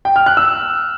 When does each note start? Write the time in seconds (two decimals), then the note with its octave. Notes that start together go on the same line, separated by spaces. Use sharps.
0.05 G5
0.16 F6
0.26 F#6
0.37 E6